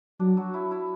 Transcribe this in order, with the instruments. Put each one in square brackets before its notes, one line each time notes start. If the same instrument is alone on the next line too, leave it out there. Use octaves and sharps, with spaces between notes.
[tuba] F#3 [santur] D4
[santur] F#3 F#4
E4
E4